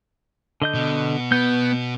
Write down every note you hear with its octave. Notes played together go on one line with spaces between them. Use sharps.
D3 D#5 G6
B2
B3 G6